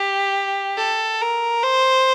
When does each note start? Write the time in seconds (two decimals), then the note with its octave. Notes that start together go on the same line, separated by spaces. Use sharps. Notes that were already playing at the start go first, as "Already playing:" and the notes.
Already playing: G4
0.77 A4
1.21 A#4
1.63 C5